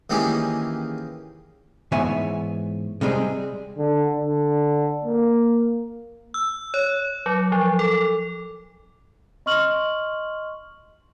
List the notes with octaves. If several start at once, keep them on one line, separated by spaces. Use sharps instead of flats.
D#3 E3 A#3 C#4 G4 G#4
G#2 E3 B3 C#5 E5 G#5
C3 G3 G#3 G#4
D3
D3
A#3
E6
C#5
F#3
F3
A4
D#5 C6 C#6 F6 F#7